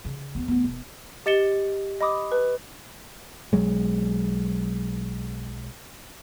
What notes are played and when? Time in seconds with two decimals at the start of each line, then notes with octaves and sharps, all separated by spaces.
0.05 C#3
0.35 E2 B3
0.48 D2 B3
0.64 E1
1.26 G4 D#5 A6 C#7 E7 G7
2.01 D#5 B5 D6 D#6
2.32 B4
3.53 B1 F#3 G#3